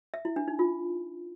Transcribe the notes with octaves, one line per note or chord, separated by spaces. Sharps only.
E5
E4
D4
D#4
F4